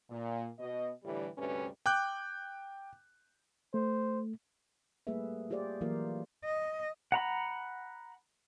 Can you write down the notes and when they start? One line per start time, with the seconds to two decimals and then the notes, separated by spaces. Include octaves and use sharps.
0.10 A#2
0.59 B2 D#5
1.04 A2 D3 E3 G3
1.37 D2 G2 C3 G3 C#4 B4
1.86 G5 D6 F#6 G6
3.74 A3 C5
5.07 G3 A3 A#3 G#4 B4 E5
5.50 F4 G4 G#4 C5 D5 F5
5.81 E3 F#3 A#3 F4 A#4 F5
6.45 D#5
7.12 F#5 A#5 B5